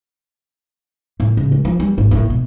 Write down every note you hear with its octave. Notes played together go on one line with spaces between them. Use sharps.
A2
C#3
G#3
F3
G3
G#1
A2
B2